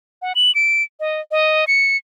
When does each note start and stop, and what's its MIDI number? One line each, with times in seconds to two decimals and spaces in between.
0.22 0.33 78
0.35 0.54 102
0.55 0.83 98
1.00 1.21 75
1.31 1.65 75
1.67 1.97 97